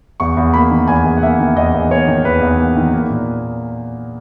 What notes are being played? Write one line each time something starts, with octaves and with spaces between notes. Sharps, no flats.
E2 C#6
E2
A#3 B5
D#3
E2 G#5
E2
F#5
A#3 E5
D#3
E2 D#5
E2
A#3 C#5
D#3
E2 B4
E2
A#3
D#3
A#3
A#2